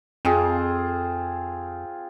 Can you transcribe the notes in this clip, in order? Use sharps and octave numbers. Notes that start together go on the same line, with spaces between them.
F2 C4 F4 G#4